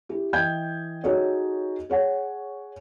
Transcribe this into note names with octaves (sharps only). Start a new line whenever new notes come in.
E4 G4
E3 D#5 G5 G6 G#6
D#4 F#4 G#4 A4 C#5 D#5
G#4 C#5 F#5